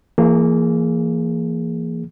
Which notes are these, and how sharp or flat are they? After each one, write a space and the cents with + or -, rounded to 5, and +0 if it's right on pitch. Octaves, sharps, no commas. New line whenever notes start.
E3 +40 A#3 -10 G#4 +5